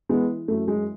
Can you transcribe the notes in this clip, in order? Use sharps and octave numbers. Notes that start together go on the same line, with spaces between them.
E3 G#3 B3
F#2 A3
G#3